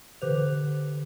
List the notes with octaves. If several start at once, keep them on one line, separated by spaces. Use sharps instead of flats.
D3 E3 G4 B4 C5 F7